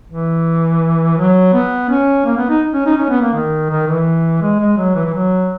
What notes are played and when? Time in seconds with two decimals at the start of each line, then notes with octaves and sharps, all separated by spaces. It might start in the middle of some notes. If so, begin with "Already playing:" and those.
0.09 E3
1.17 F#3
1.53 B3
1.90 C#4
2.25 A#3
2.37 B3
2.49 D#4
2.73 C#4
2.86 D#4
2.97 C#4
3.10 B3
3.21 A#3
3.33 D#3
3.70 D#3
3.87 E3
4.42 G#3
4.59 G#3
4.78 F#3
4.95 E3
5.06 E3
5.13 F#3